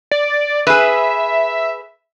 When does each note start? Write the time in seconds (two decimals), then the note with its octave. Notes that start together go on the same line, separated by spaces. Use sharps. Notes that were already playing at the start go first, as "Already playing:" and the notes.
0.11 D5
0.67 G#4 B4 E5